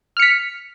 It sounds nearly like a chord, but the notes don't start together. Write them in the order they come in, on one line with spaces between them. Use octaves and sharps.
F6 C#7 B6